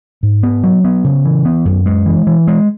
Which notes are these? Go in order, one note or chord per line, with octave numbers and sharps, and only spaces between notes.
G#2
B3
F#3
B3
C#3
E3
B3
F#2
G#3
E3
E3
G#3